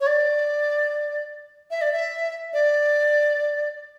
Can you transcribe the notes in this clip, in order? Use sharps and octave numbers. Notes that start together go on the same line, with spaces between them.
C#5
D5
E5
D5
E5
D5